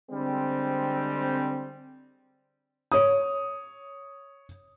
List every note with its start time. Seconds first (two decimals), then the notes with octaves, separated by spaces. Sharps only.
0.11 D3 G3 G#3 C4
2.92 C#5 D#6